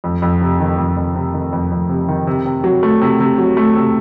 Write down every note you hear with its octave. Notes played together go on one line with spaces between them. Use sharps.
F2
F2
C3
D#3
F2
F2
C3
D#3
F2
F2
C3
D#3
C3
C3
F#3
A3
C3
C3
F#3
A3
C3